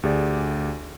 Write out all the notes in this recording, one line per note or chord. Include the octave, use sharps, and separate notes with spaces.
D2 G4 G#4 D5